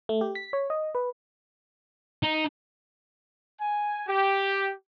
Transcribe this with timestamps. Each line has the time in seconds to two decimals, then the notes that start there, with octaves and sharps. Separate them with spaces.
0.09 A3
0.21 G4
0.35 B6
0.53 C#5
0.70 D#5
0.95 B4
2.23 D#4
3.60 G#5
4.06 G4